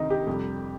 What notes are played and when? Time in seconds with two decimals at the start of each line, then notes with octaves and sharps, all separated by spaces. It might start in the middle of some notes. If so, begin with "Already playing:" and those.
Already playing: D2 C3 D#3 D#4
0.10 G4
0.27 F2 C3 G3